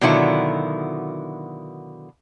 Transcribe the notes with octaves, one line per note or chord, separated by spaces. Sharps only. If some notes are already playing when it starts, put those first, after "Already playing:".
B2 D3 D#3 F#3 E4 F4